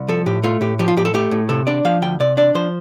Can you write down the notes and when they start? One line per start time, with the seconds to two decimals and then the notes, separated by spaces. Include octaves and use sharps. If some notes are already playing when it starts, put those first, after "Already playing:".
Already playing: C2
0.08 F3 A4
0.26 A2 G4
0.43 A3 F4
0.61 A2 G4
0.79 F3 G4
0.88 F4
0.97 A2 G4
1.05 A4
1.14 A3 G4
1.31 A2
1.49 C3 A4
1.67 D4 D5
1.85 F3 F5
2.02 D2 G5
2.20 C3 D5
2.37 D4 D5
2.55 F3 C5